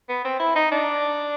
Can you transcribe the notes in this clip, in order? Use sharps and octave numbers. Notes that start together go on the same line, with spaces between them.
B3
C4
E4
D#4
D4